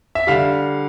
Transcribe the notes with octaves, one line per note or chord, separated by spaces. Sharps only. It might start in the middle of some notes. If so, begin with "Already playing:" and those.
E5
D3 G3 F5